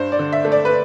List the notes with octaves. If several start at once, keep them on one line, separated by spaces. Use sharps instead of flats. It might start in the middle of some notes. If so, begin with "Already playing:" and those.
Already playing: G2 C5
D5
D3
E5
A3
D5
B4